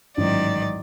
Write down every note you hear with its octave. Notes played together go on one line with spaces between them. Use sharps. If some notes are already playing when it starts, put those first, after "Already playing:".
A1 G#2 D#3 F#3 D5